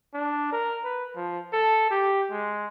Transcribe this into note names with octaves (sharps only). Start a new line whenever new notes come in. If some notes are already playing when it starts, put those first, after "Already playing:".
D4
A#4
B4
F3
A4
G4
G#3